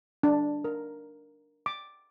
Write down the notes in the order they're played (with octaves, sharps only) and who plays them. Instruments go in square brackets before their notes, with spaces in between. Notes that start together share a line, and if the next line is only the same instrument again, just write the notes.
[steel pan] D4
A#4
D6